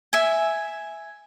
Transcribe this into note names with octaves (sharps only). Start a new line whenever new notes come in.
E5 G#5